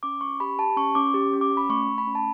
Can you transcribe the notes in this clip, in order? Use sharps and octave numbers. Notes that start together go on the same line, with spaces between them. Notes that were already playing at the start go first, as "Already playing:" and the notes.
C#4 D6
C#4 C#6
G4 B5
G4 A5
C#4 C#6
C#4 D6
G4
C#4
D6
C#4
B5
A3 C#6
A3
B5
C#4
A5